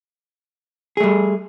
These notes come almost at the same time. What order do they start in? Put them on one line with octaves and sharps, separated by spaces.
G#4 A3 G3